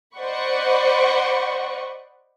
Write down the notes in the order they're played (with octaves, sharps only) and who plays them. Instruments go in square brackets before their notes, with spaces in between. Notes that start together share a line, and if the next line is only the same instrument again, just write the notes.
[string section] C5 D5 D#5 F#5 B5 C#6